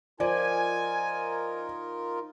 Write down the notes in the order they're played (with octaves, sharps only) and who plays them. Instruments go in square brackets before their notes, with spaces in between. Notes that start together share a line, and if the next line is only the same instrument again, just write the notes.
[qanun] F3 [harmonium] D#4 F4 A#4 [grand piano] D5 [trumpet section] G#5